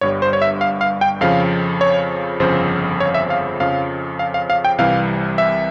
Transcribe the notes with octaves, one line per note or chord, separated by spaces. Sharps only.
G1 G2 G3 C#5
C5
C#5
E5
F5
F5
G5
F2 C#3 F3 F5
C#5
G1 F2 C#3 F3 C5
C#5
E5
F5
F2 C#3 F3 F5
F5
F5
F5
G5
C2 C3 E3 G3 F5
E5